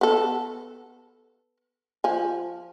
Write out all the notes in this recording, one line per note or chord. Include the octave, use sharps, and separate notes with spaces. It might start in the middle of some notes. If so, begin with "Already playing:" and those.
B3 A4
F3 G#5